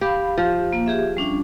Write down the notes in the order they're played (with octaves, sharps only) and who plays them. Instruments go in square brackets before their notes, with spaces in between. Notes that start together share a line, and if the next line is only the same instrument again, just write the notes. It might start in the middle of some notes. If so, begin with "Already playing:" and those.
[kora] G4 [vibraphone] F5 B5
[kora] F3 [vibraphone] G4
[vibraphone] A#3
G4 G#4 E5
G3 C#4 D4